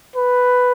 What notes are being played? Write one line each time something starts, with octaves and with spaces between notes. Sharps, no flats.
B4